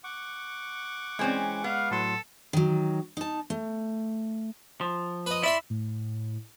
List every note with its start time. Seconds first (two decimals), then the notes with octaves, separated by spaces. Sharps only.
0.04 F#5 C#6 D6
1.19 E3 G#3 C4 C#4
1.64 B3 F5
1.91 A2 F#3 A4 C6
2.53 D#3 F#3
3.17 D#4 A5
3.50 A3
4.81 F3
5.26 B4 D#5
5.43 E4 D5 E5 C6
5.70 A2